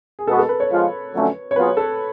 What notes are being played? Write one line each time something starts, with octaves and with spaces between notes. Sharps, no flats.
G#4
B2 G#3 B3 F#4 A4
A4
B4
C#5
F3 G#3 B3 F4
F2 D3 F#3 A3 C#4
C#5
F#3 B3 F4 G#4 B4
A4